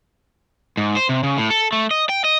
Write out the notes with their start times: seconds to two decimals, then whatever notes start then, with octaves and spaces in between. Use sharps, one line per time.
0.77 G#2
0.96 C5
1.09 C3
1.23 C#3
1.38 A2
1.50 A4
1.72 A3
1.91 D#5
2.09 G5
2.24 D#5